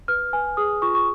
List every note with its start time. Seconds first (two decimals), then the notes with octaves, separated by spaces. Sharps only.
0.08 B4 F6
0.33 B4 G#5
0.57 G#4 D#6
0.82 F4 C#6
0.95 C#6